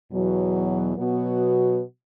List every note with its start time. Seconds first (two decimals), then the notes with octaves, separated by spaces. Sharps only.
0.11 E2 B2 F#3
0.96 B2 F#3 B3 F#4